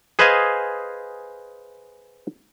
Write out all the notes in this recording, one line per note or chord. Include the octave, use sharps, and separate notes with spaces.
G#4 B4 C5 D#5 F5 G#5